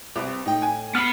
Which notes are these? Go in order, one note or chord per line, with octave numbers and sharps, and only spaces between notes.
C2 C4 B4
A2 D#4 G5
G#5
B3 B5 F6 C7